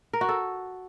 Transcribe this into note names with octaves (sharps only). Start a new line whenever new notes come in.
A#4
F#4
A4